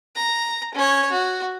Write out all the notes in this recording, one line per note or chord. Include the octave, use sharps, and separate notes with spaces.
A#5
C#4 C#5
F#4